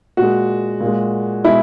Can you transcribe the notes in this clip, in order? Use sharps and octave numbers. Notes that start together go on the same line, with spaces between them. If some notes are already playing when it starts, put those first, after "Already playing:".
A#2 G#3 F#4
A#2
G#3
B2 G#3 E4